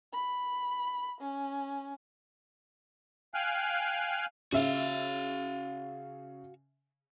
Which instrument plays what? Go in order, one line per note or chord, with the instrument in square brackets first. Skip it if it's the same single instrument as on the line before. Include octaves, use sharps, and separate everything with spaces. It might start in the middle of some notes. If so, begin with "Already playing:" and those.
[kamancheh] B5
C#4
[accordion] F5 G5 G#5 F6 F#6
[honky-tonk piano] C#3 E5 [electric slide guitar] F#4 F5